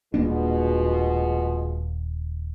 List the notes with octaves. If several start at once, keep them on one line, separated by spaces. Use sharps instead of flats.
D#1 B2 G#3 A#3 D4 F4